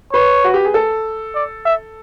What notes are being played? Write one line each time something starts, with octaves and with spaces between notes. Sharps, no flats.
B4 C#5
F#4
G4
G#4
A4
D5
E5